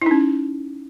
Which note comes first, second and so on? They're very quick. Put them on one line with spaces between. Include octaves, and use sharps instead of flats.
E4 D#4 C#4